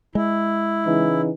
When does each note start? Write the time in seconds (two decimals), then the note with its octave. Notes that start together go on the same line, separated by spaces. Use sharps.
0.15 G#3 E4
0.86 C#3 E3 D#4